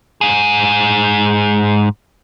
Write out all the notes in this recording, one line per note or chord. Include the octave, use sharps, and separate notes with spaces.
G#2 G#4